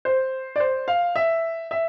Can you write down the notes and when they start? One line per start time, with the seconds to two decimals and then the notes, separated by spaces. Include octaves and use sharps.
0.05 C5
0.56 D5
0.60 C5
0.88 F5
1.16 E5
1.71 E5